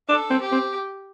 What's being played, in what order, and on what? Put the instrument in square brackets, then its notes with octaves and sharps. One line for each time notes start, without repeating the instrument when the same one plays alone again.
[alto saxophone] D4 [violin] A4
[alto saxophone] C4
[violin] G4
[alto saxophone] C4